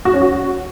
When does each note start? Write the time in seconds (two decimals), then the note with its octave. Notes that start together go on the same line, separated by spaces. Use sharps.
0.05 F#4
0.13 C#4
0.22 F#4